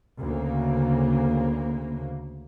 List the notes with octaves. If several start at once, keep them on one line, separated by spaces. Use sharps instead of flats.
D2 C#3 A#3